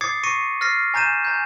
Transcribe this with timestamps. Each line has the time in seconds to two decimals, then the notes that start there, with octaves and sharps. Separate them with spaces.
0.01 D6 D#6 G#6 A6 C7 C#7
0.23 C#6 A#6 C7 C#7 D#7
0.61 F6 A6 A#6 C7
0.94 G#5 A#5 G6 A6 D#7 E7
1.25 G#5 A#5 G6